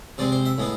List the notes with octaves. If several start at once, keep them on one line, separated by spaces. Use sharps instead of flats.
C3 G#3 C4 D5
C5
E5
A2 G#3 B3